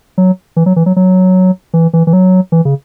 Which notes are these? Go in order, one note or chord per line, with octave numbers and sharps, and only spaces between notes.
F#3
E3
F#3
E3
F#3
F#3
E3
E3
E3
F#3
E3
C#3